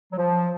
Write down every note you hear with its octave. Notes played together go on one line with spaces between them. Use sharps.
F#3
F3